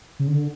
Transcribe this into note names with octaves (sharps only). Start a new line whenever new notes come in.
C#3
D3